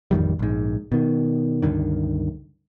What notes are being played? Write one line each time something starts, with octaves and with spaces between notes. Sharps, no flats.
A1 F2 D#3 G3
A#1 G#2
B2 D#3
C#2 G2 D3 D#3